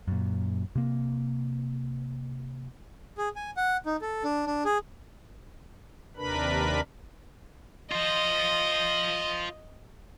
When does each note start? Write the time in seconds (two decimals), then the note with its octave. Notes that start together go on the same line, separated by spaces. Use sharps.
0.07 F#2 A#2
0.75 C3 A#3
3.18 G#4
3.36 G#5
3.57 F#5
3.86 D#4
4.01 A4
4.24 D4
4.46 D4
4.65 G#4
6.16 D#2 C3 D4 A#4 B4 B5
7.92 F4 C5 D#5